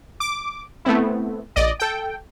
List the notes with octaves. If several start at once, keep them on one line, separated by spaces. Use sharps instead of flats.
D6
A3 B3 C4 E4
A#1 D5 D#5
A4 G5